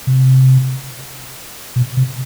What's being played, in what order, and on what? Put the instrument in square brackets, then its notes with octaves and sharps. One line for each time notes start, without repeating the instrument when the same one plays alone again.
[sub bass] C3
B2
C3